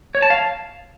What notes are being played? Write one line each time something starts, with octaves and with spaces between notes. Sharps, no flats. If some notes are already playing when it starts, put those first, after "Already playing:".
C#5
A5
F5